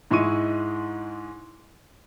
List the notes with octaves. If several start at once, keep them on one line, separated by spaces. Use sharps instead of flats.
G#2 G#3 E4 D#5 C#6 D#7